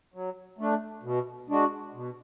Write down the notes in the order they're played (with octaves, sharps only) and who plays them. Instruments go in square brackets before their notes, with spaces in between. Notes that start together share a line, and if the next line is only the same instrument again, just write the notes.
[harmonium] F#3
A3 D4
B2
G#3 D4 F#4
B2